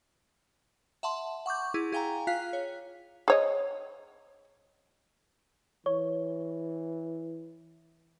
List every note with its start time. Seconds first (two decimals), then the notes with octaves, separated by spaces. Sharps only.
1.03 E5 F#5 A5 C6
1.46 F#5 C#6 D6 G6
1.74 E4 G#4
1.92 G#4 F5 G5 G#5 A#5
2.27 F4 F5 F#6 B6
2.53 C#5
3.28 G#4 C#5 D#5
5.86 E3 C#5